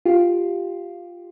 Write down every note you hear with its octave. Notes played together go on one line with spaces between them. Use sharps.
F4 G4